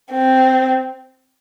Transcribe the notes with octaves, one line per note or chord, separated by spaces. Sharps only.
C4